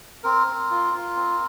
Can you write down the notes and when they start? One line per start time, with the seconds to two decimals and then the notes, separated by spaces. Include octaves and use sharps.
0.24 C4 A#4
0.47 C4
0.71 F4
0.94 F4
1.16 C4